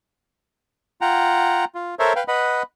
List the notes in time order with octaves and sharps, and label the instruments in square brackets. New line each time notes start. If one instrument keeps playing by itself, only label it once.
[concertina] F4 F#5 G5 A#5
F4
A4 A#4 C5 C#5 E5
B4 F5 G5
B4 D#5 F#5 B5